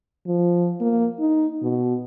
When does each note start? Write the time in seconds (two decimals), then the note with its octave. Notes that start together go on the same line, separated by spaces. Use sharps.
0.27 F3
0.80 A#3
1.19 D#4
1.62 B2